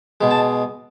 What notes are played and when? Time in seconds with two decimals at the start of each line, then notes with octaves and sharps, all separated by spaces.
0.21 B2 G#3
0.31 A5